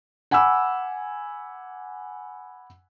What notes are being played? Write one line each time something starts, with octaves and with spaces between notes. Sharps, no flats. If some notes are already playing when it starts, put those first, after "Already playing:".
F#5 G#5 B5 D6 E6